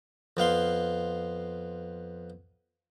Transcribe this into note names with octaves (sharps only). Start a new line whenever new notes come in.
F2 B3 F5 C6